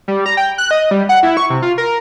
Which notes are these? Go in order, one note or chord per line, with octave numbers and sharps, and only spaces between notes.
G3
A#5
G5
F#6
D#5
G3
F#5
E4
C#6
C3
F4
A#4